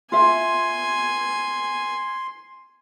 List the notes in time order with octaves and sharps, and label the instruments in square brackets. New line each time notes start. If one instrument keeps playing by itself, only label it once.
[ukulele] F4 E5 [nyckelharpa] G#5 [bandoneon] C6